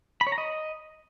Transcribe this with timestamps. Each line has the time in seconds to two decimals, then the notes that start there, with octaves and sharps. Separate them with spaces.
0.21 B5
0.27 C#5
0.32 A#5
0.38 D#5